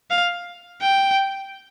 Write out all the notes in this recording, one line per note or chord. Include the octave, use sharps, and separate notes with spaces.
F5
G5